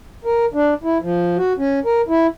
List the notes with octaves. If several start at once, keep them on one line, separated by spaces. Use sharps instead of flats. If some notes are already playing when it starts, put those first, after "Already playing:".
A#4
D4
E4
F3
F#4
C#4
A#4
E4